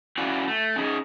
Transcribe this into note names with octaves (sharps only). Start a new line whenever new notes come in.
C#4 E4 F#4 D5 F5 F#5
A3
C#4 D#4 G#4